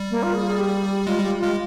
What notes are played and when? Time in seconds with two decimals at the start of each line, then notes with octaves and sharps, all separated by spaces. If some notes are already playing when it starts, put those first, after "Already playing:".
Already playing: G3
0.11 A#3
0.23 F4
0.34 G#4
0.47 G#4
0.59 G4
1.07 G#3 F4
1.18 G3 G4
1.39 G#3 F4